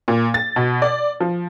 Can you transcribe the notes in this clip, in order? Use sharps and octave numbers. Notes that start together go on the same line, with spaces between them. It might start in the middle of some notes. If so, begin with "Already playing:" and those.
A#2
A6
B2
D5
F3